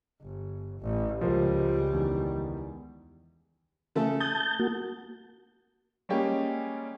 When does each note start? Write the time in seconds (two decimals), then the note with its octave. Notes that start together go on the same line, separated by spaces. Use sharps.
0.21 G1
0.80 A1
1.21 C#2 F3 G3 A#4 C5
1.93 E2 D#3
3.95 C#3 A3 A4
4.20 A5 D#6 G6
4.59 A#3 F#4
6.09 G3 G#3 A#3 C#4 G4